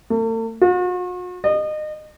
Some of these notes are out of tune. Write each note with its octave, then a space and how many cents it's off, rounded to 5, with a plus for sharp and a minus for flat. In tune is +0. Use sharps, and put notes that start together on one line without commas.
A3 +45
F#4 -45
D#5 -30